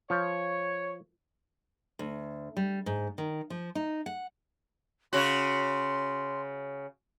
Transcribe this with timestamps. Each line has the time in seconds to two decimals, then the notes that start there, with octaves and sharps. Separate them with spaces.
0.10 F3 C#5
1.99 D2
2.57 G3
2.86 G#2
3.18 D#3
3.50 F3
3.75 D#4
4.06 F#5
5.13 C#3 F#4 C6